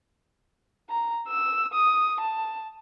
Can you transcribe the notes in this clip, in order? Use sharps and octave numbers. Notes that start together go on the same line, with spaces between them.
A#5
E6
D#6
A5